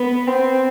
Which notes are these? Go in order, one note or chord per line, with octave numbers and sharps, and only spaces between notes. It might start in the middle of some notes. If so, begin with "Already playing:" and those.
Already playing: B3
C4